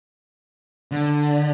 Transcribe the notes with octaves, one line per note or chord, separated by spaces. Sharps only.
D3